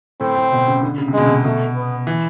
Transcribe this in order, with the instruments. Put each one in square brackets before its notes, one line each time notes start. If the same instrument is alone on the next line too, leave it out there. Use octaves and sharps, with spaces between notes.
[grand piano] A2 [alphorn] C4
[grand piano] A2
B2
C#3
D3
C#3
C3
[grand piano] B2 [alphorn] G#3
[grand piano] C3
[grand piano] B2 [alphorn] A3
[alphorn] B3
[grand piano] E3